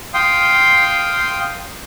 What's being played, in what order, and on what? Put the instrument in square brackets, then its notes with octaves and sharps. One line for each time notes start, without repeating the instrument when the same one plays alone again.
[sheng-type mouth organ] F5 G5 C6 D#6